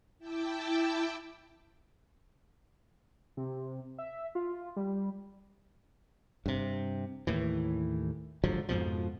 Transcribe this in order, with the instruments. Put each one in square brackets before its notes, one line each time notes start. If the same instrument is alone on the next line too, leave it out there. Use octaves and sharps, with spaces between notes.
[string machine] E4 G5 A5 D6 E6
[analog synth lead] C3
E5
F4
G3
[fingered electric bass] G2 C3
D#2 A2 E3
G#2 D3 F3 F#3
F2 G#2 B2 F3